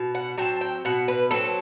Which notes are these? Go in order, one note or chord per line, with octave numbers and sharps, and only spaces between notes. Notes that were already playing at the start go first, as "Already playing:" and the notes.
Already playing: B2
F#5
F#3 C4 A5
G5
B2 F#5
B4
F#3 C4 A4